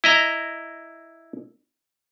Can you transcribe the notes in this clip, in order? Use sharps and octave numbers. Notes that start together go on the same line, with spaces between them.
E4 D#5 A#5